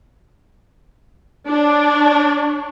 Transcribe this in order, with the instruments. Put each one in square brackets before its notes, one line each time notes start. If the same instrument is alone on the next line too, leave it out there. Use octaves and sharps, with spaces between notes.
[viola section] D4 C#5